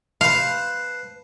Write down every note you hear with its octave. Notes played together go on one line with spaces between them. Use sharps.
B4 C5 F5 A5